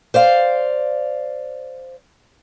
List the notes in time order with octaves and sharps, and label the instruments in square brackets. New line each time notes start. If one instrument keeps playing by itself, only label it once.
[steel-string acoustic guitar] C5 D5 F5